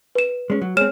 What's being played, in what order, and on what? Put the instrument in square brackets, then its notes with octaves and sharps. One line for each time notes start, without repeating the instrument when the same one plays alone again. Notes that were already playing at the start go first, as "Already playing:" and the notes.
[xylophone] B4 E7
[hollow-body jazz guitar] G#3 C#4
F#3
[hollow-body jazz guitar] G#3 C4 [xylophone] C#5 F6 E7